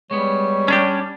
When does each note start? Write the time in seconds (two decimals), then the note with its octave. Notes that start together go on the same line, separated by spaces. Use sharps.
0.11 G3 G#3 B3 C#5
0.68 C#4 D4 G4